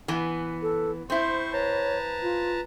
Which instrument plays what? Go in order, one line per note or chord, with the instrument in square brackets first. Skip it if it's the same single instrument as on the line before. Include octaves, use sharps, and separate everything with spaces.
[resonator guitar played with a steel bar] E3 B3 G#5
[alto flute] A4
[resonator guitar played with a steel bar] C4 E4 [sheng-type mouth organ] C5 C#6 [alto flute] C6
[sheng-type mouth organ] B4 A5 A#5 [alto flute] C#5
[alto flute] F4